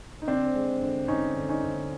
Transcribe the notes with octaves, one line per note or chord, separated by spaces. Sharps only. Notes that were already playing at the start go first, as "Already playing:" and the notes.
D#4
D3 C4 D4
G#3
D3
D3 C#4 D#4
D3
C#4 D#4
D3